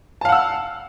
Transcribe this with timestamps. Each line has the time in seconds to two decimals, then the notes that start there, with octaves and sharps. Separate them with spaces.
0.21 A5
0.25 F5
0.29 F#5
0.32 E6